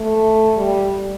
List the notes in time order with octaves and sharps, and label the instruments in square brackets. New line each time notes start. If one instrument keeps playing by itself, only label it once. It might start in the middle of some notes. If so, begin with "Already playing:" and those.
Already playing: [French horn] A3
G3